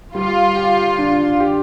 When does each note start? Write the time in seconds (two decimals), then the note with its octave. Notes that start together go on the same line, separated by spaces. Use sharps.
0.15 G3 F4
0.56 G4
0.98 D4
1.40 G4